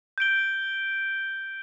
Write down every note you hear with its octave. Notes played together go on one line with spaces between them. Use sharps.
G6 D7 G7